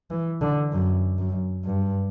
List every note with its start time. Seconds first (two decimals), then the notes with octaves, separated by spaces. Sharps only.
0.10 E3
0.41 D3
0.72 F#2
1.18 F#2
1.65 G2